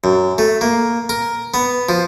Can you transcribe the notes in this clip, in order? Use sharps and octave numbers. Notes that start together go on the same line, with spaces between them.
F#2
A3
A#3
A#4
B3
F3